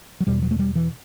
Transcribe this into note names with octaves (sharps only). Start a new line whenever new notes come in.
F#3
E2 B2 G3
F#3
A3
G3
E3